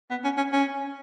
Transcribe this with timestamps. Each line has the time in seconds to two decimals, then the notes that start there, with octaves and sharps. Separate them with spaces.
0.10 B3
0.24 C#4
0.37 C#4
0.52 C#4